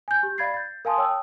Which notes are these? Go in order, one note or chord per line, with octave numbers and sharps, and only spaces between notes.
G#5 G6
G4
D5 F5 B5 G#6 A6 C7
G6 A6
A#4 F5 G#5 A5 C6 D#6
C#5 G5 A5 D#6 E6